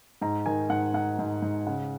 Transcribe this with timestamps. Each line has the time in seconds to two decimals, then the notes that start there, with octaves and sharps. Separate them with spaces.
0.21 G#2 A#5
0.46 D#3 G#5
0.70 G#2 F#5
0.94 G#2 F#5
1.19 G#2
1.42 G#2
1.67 C#3 F#5